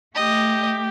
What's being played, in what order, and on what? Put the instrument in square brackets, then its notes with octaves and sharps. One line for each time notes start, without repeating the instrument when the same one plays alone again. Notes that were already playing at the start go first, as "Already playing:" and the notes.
[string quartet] A3 G4 [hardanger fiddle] D#5